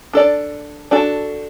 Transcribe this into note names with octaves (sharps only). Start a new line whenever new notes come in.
D4 A4 D5
D4 F#4 A4